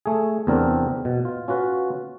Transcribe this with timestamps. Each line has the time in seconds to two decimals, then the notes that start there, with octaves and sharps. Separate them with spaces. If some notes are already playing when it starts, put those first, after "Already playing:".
0.06 A3 G#4
0.47 E2 C3 B3 C4 D4 A#4
1.05 B2
1.25 F4
1.48 C#4 F4 F#4 B4